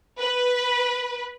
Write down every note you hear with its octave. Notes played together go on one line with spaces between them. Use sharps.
B4